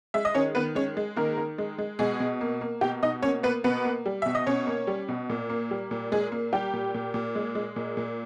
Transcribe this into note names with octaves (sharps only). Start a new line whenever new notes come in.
G#3 E5
D#5
D#3 C#4 C#5
D#3 B3 B4
G#3 C#4 C#5
G#3
D#3 A#3 A#4
D#3
G#3
G#3
B2 G#3 G#4
B2
A#3
A#3
B2 G4
B2 D#4 D#5
A#3 C#4 C#5
A#3 B3 B4
B2 B3 B4
A#3
G3
B2 E5
D#5
B2 C#4 C#5
A#3
G3
B2
A#2
A#3
G3
A#2
A#2 G#3 G#4
A#3
G3 G4
A#2
A#2
A#2
G#3
G#3
A#2
A#2